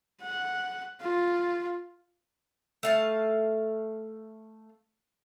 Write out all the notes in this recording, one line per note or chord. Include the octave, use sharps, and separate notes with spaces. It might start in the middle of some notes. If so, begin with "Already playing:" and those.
F#5
F4
A3 F5 A5